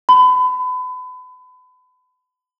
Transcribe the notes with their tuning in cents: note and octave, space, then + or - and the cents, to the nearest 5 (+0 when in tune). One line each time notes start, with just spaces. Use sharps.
B5 +35